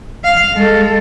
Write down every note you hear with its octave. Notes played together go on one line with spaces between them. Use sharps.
F5
G#3 A4